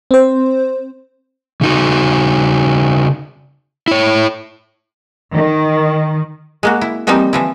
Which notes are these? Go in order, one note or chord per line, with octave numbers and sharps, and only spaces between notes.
C4 C5
C#3 D#4 F#4
E4 C#5
D#3
G#3 A#3 F#4
E4
E3 F3 G3 A#3 C4 D#4
E3 F3 E4